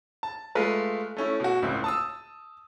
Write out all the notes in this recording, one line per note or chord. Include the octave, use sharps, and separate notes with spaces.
A5
G#3 A3 F4 B4
A3 C#4 E4
B2 F#4
C#2 A2 C4
A5 D#6 E6